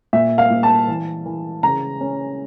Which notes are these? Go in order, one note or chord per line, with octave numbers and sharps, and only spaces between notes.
A#2 E5
F5
A#2
A5
E3
E3
C#3 A#5
C#4